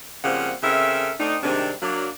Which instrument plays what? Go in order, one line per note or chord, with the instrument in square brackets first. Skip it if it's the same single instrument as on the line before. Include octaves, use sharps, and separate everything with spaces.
[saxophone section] C#3 F3 G3 A#3 C4 F#5
C#3 C4 A4 A#4 E5
A3 C4 D4 D#4
C3 D#3 G3 G#3 C4 D4
F#3 A#3 D4